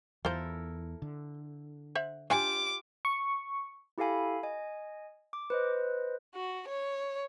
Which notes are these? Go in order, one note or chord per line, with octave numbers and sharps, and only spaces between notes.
E2 E4 F4 A4 A#4 C5
D3
C5 E5 F#5
D4 F4 G4 G#5 D6
C#6
E4 G4 A4 F5 G#5 B5
D#5 G#5
D6
B4 C5 D#5
F#4
C#5